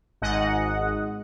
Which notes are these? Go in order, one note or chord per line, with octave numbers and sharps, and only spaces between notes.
G#1 G#2 D#5 F#5